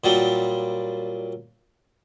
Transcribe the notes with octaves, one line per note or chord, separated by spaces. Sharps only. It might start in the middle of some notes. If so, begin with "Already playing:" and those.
A#2 F#3 G3